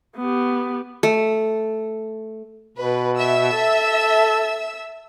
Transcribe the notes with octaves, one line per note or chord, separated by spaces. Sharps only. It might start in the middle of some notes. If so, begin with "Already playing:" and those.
B3 G4
A3
B2 B4
E5 E6
A4